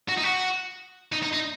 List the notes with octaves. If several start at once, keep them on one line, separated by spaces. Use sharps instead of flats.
F#4
D#4
F#4
D#4
D#4
D#4